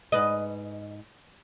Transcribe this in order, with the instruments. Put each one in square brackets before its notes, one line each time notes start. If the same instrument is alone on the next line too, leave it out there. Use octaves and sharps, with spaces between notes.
[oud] G#2 B4 D#5